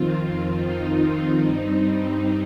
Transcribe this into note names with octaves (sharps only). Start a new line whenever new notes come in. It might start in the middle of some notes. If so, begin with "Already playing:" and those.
Already playing: F2 D#3 C4 F4
D#4
G2 G3 C4